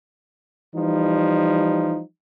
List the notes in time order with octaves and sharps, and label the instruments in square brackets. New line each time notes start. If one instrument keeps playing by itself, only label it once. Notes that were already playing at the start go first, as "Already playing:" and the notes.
[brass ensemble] E3 F3 G3 D#4